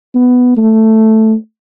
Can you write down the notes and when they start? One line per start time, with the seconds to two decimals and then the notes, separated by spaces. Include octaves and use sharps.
0.15 B3
0.57 A3